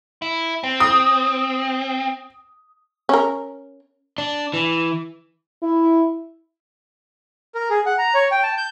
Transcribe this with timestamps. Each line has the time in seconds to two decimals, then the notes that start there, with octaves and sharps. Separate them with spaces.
0.22 E4
0.63 C4
0.80 D#6
3.09 C#4 A#4
4.18 D4
4.54 E3
5.63 E4
7.55 A#4
7.70 G#4
7.86 F#5
7.98 A#5
8.14 C#5
8.31 G5
8.43 A5
8.58 G6